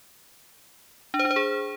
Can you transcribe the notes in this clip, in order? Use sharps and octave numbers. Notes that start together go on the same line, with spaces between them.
D4
C5
D4
C5
G#4